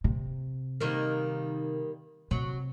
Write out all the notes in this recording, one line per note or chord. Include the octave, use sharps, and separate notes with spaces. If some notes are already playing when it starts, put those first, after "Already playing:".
C3
D#3 G3 A#3
C3 F#3